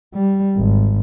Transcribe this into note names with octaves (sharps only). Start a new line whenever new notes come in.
G3
G#1